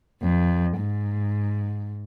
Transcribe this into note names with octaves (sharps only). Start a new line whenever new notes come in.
F2
G#2